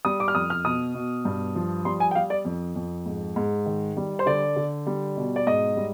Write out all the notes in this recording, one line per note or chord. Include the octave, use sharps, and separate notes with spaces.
G3 D#6
D6
F6
F2 D#6
F6
B2 D#6
B2
G2
F3
G3 C6
G#5
G5
G3 F5
D5
F2
F2
G#2
G#2
D#3
G3
C5
D3 D5
D3
G3
B2
D5
G#2 D#5
G3